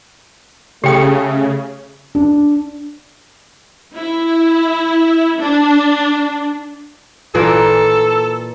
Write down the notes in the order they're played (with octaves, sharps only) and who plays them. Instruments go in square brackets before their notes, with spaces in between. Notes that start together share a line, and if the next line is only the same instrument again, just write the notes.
[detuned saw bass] C#3 [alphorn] A3 [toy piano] G4 G5 D#6
[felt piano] D4
[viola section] E4
D4
[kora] A#2 E3 A#3 [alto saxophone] A4